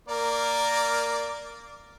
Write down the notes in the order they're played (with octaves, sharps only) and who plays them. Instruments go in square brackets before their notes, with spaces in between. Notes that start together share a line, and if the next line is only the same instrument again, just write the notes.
[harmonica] A#3 A#4 D5